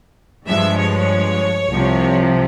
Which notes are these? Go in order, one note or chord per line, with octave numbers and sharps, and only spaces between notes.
G2 F3 G#3 E5
C#5
C2 C3 F3